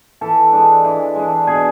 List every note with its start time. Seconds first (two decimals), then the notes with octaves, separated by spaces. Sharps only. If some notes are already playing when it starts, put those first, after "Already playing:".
0.21 E3 A4
0.53 G#3 D4
0.85 E3
1.16 G#3 D4
1.47 B2 G#4